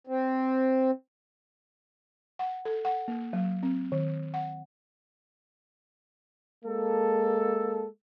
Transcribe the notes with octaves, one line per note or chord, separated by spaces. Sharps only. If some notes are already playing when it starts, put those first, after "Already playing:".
C4
F#5
A4
F#5
A#3
F#3
C4
D#3
F#5
G#3 A#3 A4